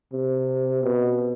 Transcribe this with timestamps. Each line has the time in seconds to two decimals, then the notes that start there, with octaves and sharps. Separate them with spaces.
0.13 C3
0.83 B2